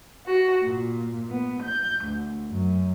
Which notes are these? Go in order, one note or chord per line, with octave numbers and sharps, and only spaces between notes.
F#4
A#2
B3
G6
D2
F#2